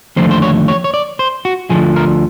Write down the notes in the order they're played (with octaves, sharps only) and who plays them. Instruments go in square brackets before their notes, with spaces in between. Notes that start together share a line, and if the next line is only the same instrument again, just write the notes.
[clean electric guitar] D#2 D3 F3 A3 C5
C5
C#5
C#5
C#5
D5
C5
F#4
D2 D3 F3 G#4
A#4